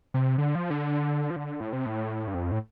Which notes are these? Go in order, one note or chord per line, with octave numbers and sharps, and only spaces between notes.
C3
D3
F3
D3
F3
D3
A2
C3
A2
G2
F2
A2